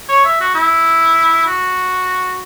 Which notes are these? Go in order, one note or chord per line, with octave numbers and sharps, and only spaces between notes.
C#5
E5
F#4
E4
F#4